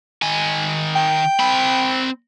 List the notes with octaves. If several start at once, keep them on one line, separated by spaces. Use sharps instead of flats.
D#3 G#5
G5
C4 B5